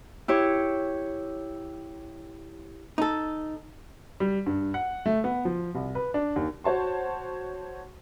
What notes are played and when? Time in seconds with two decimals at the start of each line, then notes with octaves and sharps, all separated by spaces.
0.28 E4 G4 C#5
2.98 D#4 A4
4.20 G3
4.46 G2
4.74 F#5
5.06 A3
5.24 B3
5.45 F3
5.75 C2
5.95 B4
6.14 D4
6.36 D#2
6.64 F#4 C5 C#5 A5 C6